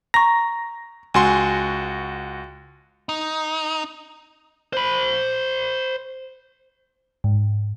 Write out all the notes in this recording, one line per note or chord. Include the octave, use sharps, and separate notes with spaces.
A#5 C#6 A#6
C#2 F#4 G#5 C6
D#4
C5 B5
G#2